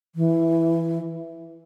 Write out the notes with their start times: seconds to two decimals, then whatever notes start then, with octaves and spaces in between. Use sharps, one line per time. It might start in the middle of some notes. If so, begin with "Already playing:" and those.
0.15 E3